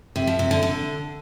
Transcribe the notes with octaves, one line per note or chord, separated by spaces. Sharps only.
C3
F3
C3
D3
D3